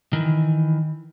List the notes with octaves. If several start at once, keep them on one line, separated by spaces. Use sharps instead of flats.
D#3 E3